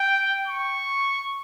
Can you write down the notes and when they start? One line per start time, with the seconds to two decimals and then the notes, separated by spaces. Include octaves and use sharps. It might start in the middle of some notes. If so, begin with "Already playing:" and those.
Already playing: G5
0.47 C#6